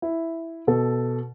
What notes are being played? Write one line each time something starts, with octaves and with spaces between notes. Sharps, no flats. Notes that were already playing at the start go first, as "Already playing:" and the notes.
E4
B2 A4